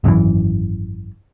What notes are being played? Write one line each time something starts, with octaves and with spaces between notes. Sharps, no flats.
G#1 F#2 C3 E3